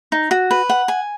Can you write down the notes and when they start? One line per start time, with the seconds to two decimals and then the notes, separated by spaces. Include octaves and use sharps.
0.12 D#4
0.31 F#4
0.51 B4
0.70 F#5
0.88 G#5